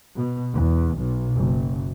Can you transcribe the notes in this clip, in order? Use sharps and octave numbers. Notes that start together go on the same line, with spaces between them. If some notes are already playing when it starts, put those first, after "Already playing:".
B2
E2
B1
F#1